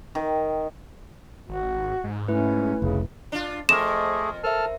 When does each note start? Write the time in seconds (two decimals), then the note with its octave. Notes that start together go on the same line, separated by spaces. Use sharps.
0.15 D#3
1.49 G#1 F#4
2.04 G#2
2.28 A3 C#4 E4 B4
2.82 F1 B1 C#3
3.32 D4 F4
3.69 F2 A3 G#4 A#4 C6 D6 A#6 E7
4.44 A4 A#4 C5 E5 A5 F6